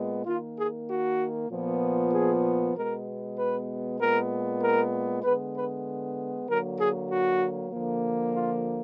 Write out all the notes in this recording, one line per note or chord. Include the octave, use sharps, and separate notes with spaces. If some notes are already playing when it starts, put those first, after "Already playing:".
Already playing: A#2 G#3 B3
D#3 A#3 F4
G#4
F#4
A#2 F3 B3
G#4
B2 G#3 B3 A#4
B4
A#2 G#3 B3 A#4
A#4
D3 G#3 B3 B4
B4
D3 F#3 A#3 A#4
G#4
F#4
D3 F3 A#3
F4